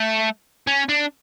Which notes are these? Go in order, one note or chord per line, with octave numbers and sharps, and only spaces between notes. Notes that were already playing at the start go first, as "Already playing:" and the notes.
Already playing: A3
C#4
D4